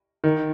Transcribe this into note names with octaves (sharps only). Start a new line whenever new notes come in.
D#3